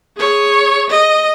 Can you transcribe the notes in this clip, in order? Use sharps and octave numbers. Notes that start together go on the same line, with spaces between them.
G#4 C#5
D#5